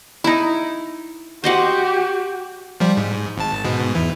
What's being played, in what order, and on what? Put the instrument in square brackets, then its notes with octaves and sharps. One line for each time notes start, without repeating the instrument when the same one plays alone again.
[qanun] D#4 E4
[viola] F#4 G4 [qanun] C5 D#5 F#5
[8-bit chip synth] F3 G3
G#2
G#1 A5
G#2 B2
E2 E3